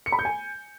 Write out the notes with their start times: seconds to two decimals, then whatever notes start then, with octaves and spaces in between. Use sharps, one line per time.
0.06 C#7
0.12 B5
0.19 G6
0.25 G#5